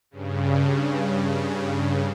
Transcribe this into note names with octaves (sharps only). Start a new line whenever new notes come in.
G2 C#3